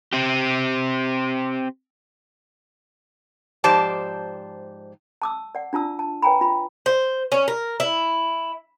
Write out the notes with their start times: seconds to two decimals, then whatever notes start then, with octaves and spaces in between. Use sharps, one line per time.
0.13 C4 G4
3.64 G#2 F3 G4 C5 D5 A5
5.22 A5 D6 E6
5.55 D5 F#5
5.73 D4 F4 A5 E6
5.99 A5
6.22 B4 C#5 G5 G#5 A#5 B5
6.41 F4 B5
6.86 C5
7.32 C#4
7.48 A#4
7.80 E4